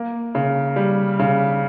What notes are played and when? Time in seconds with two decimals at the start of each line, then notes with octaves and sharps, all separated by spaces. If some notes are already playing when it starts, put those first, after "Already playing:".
Already playing: A#3
0.35 C#3
0.76 G3
1.19 C#3